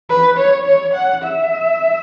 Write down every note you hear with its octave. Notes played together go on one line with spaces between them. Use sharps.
B4
C#5
C#5
F#5
E5